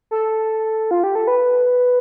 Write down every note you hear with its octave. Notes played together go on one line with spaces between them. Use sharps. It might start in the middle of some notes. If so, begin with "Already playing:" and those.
A4
F4
G4
A4
B4